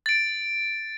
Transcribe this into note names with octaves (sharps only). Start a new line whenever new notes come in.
A6 D7